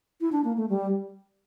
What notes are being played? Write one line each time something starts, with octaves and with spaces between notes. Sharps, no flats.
E4
D4
A#3
A3
G3